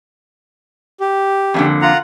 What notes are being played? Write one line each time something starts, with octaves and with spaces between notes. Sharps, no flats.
G4
F2 A#2 D3
F4 F#5 A#5